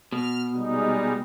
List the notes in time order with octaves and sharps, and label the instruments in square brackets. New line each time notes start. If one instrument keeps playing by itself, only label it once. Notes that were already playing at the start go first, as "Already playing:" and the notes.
[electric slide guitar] B2 [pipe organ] F6
[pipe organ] G3 G#3 D#4